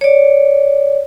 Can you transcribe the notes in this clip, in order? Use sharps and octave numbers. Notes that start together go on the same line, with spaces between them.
C#5 D5